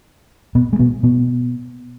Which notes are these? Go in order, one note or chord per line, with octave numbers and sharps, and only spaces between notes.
B2 B3
G#3
B2 B3
B2 B3